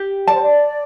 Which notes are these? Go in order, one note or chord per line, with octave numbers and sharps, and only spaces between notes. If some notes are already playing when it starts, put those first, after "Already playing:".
Already playing: G4
D5 A5
C5
D5